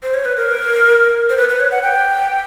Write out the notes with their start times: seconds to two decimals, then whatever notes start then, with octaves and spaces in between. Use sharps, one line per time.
0.03 C5
0.14 C#5
0.25 B4
0.37 A#4
1.30 C5
1.37 B4
1.49 B4
1.60 C#5
1.71 F#5
1.83 G5